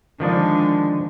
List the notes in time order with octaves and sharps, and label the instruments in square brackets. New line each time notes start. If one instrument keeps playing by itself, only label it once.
[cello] D3 G#3 [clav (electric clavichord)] D#3 F3 D4